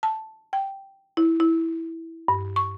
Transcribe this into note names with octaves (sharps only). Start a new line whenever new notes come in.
A5
G5
E4
E4
G2
C#6